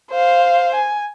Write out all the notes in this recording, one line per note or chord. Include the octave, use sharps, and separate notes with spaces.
C5 F5
G#5